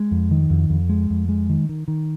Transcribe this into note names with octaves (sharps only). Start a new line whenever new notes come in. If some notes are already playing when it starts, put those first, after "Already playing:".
Already playing: G#3
F2
D#3
F2
F2
G#3
F2
G#3
D#3
D#3
D#3